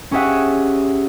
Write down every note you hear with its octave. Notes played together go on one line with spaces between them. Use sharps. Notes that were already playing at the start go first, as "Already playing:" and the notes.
C#4 G4 G#4 E5 F#5